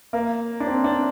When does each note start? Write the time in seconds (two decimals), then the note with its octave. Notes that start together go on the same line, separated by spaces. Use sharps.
0.13 A#3
0.60 D4
0.67 C4
0.84 D4